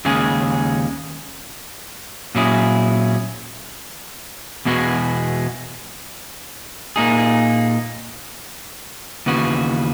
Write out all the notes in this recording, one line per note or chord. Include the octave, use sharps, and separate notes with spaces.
D#2 C#3 G#3 C#4 G#4
A#2 F#3 C#4 E4 G#4
E2 B2 G#3 B3 F#4
A#2 A#3 D#4 G#4
D#2 C#3 E3 B3 F#4